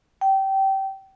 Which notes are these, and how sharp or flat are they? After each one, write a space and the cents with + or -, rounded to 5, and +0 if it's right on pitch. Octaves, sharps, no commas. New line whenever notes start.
G5 -20